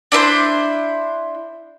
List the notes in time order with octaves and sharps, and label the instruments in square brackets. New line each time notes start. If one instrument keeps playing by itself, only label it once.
[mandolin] D4 E4 B4 C5